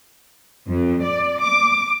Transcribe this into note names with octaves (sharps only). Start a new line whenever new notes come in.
F2
D5
D6